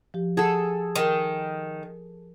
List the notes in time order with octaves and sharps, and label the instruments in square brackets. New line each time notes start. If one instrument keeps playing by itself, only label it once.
[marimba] F3 G4
[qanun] G#4 A4 [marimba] F#5 A5
[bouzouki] D#3 [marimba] A#4